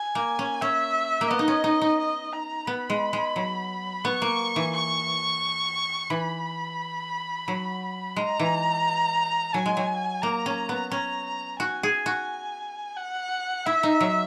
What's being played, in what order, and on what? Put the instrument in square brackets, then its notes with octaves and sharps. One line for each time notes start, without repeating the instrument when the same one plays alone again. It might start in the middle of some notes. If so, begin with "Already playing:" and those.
Already playing: [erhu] G#5
[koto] A#3
C#4
[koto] C#4 [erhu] E5
[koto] A#3
[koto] B3 [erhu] D#5
[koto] D#4
C#4
D#4
D#4
[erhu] D#5
A#5
[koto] B3 [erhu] B5
[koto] G#3
G#3
F#3
[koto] B3 [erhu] C#6
[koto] A#3
E3
[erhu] C#6
[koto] E3 [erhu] B5
[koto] F#3
[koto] G#3 [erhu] A#5
[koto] E3
[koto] F#3 [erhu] G#5
[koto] G#3
F#3
[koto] A#3 [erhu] A#5
[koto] C#4
B3
[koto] C#4 [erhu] A#5
[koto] F#4 [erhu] G#5
[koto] G#4
F#4
[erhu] F#5
[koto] E4 [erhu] E5
[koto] D#4
F#3